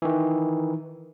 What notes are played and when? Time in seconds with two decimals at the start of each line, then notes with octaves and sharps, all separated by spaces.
0.02 D#3 E3